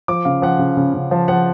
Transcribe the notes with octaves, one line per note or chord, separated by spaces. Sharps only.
F3 D6
C#3 F5
F3 F#5
C#3
C#3
C#3
F3 A5
F3 F#5